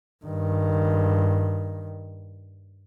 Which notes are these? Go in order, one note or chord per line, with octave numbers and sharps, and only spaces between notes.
G2 D#3